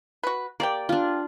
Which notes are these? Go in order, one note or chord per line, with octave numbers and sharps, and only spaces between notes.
F#4 B4
A#3 G4 D5 G5
D4 F4